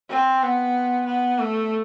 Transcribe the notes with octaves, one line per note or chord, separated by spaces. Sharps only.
C4
B3
B3
A3